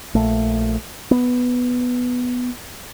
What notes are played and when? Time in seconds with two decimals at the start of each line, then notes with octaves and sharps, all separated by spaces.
0.15 A#1 A3
1.11 B3